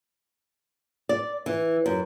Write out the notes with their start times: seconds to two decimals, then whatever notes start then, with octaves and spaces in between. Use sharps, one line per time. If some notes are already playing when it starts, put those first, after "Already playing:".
1.09 D5
1.46 E3
1.86 F#2